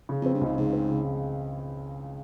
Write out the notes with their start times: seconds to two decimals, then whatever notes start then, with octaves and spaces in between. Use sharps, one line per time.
0.09 C#3
0.22 F2 C4
0.34 G2
0.41 C#2 G#2
0.57 G#2 C#3
0.73 C4
0.89 C#3